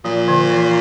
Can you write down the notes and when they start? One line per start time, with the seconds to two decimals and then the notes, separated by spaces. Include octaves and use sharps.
0.05 A#2 F3
0.28 D3
0.51 E3